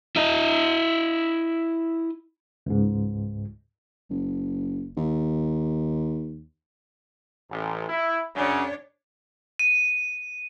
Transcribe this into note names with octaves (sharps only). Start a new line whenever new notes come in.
E4 D#5
C#2 G#2
F#1
D#2
A1
E4
F#2 C#3 D4 C#5
D#7